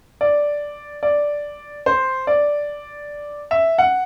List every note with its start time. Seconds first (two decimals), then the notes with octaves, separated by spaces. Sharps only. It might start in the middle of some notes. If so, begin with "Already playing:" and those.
0.21 D5
1.03 D5
1.86 C5
2.27 D5
3.51 E5
3.78 F#5